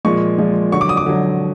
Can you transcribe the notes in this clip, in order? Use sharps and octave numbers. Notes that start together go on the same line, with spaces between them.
A#2 F3 G#3 C#6
A#2 F3 G#3
D3 F#3 C#6
D6
D#6
D6
D3 F#3